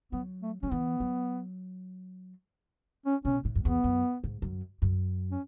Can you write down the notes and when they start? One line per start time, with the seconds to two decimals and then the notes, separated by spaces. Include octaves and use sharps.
0.12 F#3 B3
0.42 A3
0.63 F#3 C#4
0.71 E3 B3
1.00 F#3
3.06 C#4
3.25 B2 C#4
3.45 A2
3.55 F#2
3.64 E2 B3
3.84 F#2
4.24 G#2
4.42 F#2
4.82 F#2
5.31 C#4